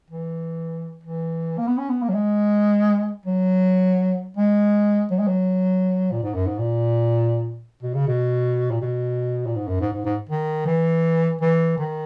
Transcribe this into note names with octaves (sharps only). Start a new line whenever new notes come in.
E3
E3
A#3
B3
C#4
B3
A#3
F#3
G#3
F#3
G#3
F#3
G#3
F#3
A#2
G#2
F#2
G#2
A#2
B2
C#3
B2
A#2
B2
A#2
G#2
F#2
G#2
G#2
G#2
D#3
E3
E3
D#3